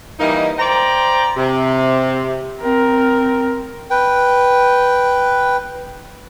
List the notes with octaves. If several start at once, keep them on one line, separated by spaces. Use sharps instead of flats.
E3 G3 A#3 D#4
C5 D5 G5 A#5
C3
C4 A#4
B4 G5